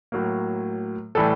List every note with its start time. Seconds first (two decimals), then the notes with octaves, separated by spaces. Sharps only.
0.12 A2 F#3 A#3
1.15 A2 E3 G3 A4